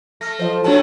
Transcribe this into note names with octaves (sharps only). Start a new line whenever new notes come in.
A3 F6 A#6
F3 C5 D#5
A2 C3 B3 D4 F#4 C#5 A5